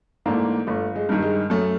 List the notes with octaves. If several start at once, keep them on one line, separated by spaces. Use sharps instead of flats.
G#2 E3 A3 A#3 D4
G1 A3
G#3
G2 D#3
G3
G#3
F#2 A3